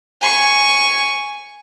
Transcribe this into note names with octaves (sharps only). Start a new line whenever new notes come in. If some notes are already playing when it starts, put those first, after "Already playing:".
G#5 C#6